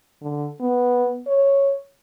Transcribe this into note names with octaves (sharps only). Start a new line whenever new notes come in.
D3
B3
C#5